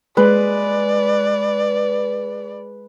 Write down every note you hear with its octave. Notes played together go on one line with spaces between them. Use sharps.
G#3 B4 D5